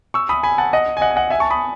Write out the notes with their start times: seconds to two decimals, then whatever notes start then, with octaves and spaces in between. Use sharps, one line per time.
0.14 C#6 E6
0.29 B5 D#6
0.43 G#5 B5
0.58 F#5 A5
0.73 D#5 F#5
0.97 G#5
1.01 D#5 F#5
1.11 G#5
1.16 D#5 F#5
1.30 E5 G#5
1.40 A5 C#6
1.50 B5 D#6